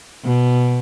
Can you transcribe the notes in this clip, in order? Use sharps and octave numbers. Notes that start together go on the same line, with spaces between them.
B2